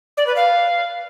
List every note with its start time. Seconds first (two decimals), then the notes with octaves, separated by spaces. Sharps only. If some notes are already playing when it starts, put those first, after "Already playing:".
0.17 D5
0.27 B4
0.36 F5